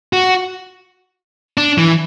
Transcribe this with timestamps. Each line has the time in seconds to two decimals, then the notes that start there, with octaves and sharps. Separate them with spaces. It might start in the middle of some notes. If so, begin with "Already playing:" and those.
0.13 F#4
1.57 D4
1.78 E3